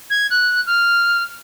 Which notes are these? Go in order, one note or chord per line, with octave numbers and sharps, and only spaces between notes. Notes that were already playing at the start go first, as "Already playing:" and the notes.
G#6
F#6
F6